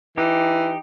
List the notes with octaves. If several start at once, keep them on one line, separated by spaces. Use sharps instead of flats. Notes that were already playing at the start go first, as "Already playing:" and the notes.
E3 D#4 G4